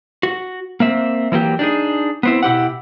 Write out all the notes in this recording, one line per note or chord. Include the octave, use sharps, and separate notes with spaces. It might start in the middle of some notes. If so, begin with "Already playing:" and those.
F#4
A#3 C4 E5
E3 F#3 A#3 G4
D4 D#4 G#4
B3 C4 E4
B2 E4 G4 F#5